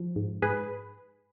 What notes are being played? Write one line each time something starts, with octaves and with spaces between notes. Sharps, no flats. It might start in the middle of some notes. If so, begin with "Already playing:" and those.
Already playing: F3
G#2
G#2 G#4 B4